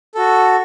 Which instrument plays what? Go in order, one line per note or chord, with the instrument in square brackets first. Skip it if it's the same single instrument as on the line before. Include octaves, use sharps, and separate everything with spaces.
[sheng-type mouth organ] F#4 A4